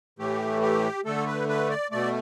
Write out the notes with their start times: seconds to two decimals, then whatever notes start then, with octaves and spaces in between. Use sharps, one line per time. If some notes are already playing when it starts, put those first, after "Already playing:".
0.19 A2 E3 A3 G4
0.62 G4
1.05 D3 A3 A4
1.27 B4
1.49 B4
1.70 D5
1.91 B2 A3 D5